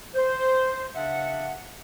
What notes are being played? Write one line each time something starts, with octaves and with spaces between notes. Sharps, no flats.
C5
C#3 D4 E5 F#5